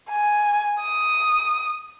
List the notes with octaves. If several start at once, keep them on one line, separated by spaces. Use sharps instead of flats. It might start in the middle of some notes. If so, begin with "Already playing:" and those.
G#5
D#6